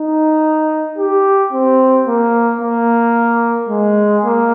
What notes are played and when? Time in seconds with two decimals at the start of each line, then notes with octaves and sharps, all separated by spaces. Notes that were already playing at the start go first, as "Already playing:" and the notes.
Already playing: D#4
0.98 G4
1.53 C4
2.07 A#3
2.61 A#3
3.69 G#3
4.24 A#3